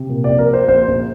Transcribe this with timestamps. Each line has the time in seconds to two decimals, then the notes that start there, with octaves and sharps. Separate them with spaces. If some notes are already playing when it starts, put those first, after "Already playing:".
Already playing: C3
0.09 A#2
0.24 A#1 D5
0.39 A#4
0.49 A#3 C5
0.68 A#1 C5
0.88 A#1